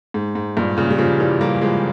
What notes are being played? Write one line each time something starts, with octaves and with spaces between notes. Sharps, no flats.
G#2
G#2
G2 A#2
A#2 C#3
G3
C#3 F3
E3 G3
G3 A#3
F3 G#3